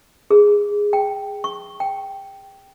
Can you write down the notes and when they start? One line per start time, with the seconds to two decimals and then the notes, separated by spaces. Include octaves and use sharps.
0.31 G#4
0.93 G5
1.44 C#6
1.80 G5